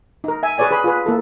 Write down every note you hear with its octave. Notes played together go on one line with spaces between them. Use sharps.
D#4 A#4
E5 G#5
G#4 B4 C#5 D5 G#5
G#4 B4 B5
F4 G#4 B4
A#3 E4 A4